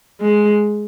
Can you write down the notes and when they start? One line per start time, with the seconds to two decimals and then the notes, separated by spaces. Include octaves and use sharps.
0.21 G#3